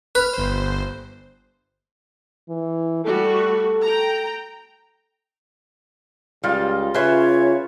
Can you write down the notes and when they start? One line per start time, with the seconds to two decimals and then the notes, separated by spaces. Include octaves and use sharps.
0.15 B4 F6
0.33 G1 C5
2.49 E3
3.05 G3 A3 F#4 A4
3.82 G5 A#5
6.44 C#2 G3 F4 D#5 F5
6.95 C#3 F4 B4 C#5 E5 G#5